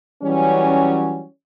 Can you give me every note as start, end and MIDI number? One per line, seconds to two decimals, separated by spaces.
0.23 1.25 52
0.23 1.25 54
0.23 1.25 55
0.23 1.25 61